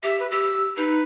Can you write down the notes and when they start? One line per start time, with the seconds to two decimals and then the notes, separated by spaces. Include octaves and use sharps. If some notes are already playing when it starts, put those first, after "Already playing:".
0.03 G4 E5
0.20 B4
0.31 G4 E6
0.77 D#4 B4